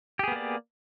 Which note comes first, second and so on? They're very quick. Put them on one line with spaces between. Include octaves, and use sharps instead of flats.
G4 G#4 B3 A#3 D5